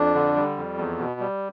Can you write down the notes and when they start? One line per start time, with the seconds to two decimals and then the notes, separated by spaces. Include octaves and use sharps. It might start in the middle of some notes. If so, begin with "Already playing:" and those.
Already playing: F2 D4
0.15 D3
0.36 G3
0.57 F2
0.78 E2
0.99 B2
1.20 G3